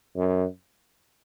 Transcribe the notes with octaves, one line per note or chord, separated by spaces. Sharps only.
F#2